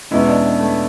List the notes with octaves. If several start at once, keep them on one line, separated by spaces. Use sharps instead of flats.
E2 B2 G#3 B3 C#4 E4
D4
A3